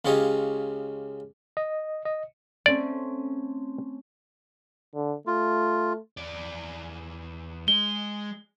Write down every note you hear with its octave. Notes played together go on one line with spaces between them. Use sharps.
C#2 C#3 F4 G4 C#5 D#5
D#5
D#5
A3 C4 C#4 D5
D3
A3 F4
E2 D5
G#3 G7